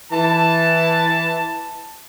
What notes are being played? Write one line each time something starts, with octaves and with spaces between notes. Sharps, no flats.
E3 A5